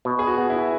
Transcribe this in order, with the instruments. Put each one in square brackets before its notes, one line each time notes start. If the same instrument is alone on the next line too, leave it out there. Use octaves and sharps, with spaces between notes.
[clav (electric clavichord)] B2
[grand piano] G#4
F#4
[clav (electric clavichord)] B3
[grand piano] E4